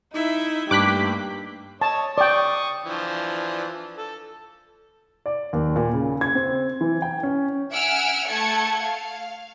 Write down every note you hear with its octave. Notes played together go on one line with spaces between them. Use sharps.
D#4 E4 E5
G2 A3 A#3 G4 D6 F#6 B6
C#5 D#5 A5
D5 G5 C#6 D#6
E3 F3 D4
A4
D5
D#2
A#2
C#3
G#6
C4
E3
G5
C#4
E5 F#5 G#5 E6 F6 D7
A3 A4 F#5 A5 G#6 C#7
F5